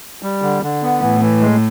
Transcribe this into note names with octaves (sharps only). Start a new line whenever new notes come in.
G3
D3
D3
B3
A2 E3
E3
G#3